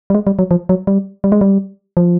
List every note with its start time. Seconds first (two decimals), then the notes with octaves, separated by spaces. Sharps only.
0.10 G3
0.15 G#3
0.27 G3
0.39 F#3
0.51 F3
0.69 F#3
0.87 G3
1.24 G3
1.32 G#3
1.41 G3
1.97 F3